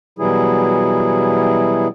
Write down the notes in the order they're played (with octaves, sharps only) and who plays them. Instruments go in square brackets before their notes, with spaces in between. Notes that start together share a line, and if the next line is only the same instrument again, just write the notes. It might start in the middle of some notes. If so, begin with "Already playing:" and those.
[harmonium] B2 E3 F#3 G3 E4 G#4